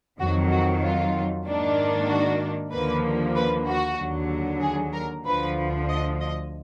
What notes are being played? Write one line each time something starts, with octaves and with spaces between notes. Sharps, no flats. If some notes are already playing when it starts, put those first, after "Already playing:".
F2 D#3 F#3 F#4
F#4
F4
G#2 D#3 A#3 D4
F#4
D#2 D3 F3 A#3 B4
B4
F#4
D#2 D3 F#3
G#4
A#4
D2 D3 F3 B4
D#5
D#5